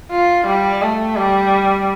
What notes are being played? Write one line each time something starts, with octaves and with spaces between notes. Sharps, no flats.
F4
G3
A3
G3